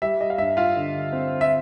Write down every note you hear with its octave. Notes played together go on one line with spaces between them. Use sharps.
G3 E5
D#5
F5
G2 E5
F4 F5
D3
C4
E5